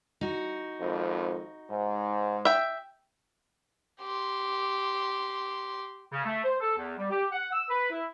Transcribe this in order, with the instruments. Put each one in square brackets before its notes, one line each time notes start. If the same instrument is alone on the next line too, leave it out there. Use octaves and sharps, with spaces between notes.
[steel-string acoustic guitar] D#4 F#4
[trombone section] G#1 F2
G#2
[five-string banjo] E5 G5
[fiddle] G4 C6
[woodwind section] C#3
A3
C5
A4
E2
G3
G4
F#5
E6
B4
E4